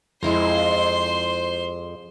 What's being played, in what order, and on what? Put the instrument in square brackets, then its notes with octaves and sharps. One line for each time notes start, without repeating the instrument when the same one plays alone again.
[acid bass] F2 [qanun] G#3 E4 A#5 [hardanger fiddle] C5 C6